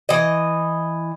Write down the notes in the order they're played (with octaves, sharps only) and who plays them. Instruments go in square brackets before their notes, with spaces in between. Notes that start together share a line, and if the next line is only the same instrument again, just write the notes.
[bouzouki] E3 D#5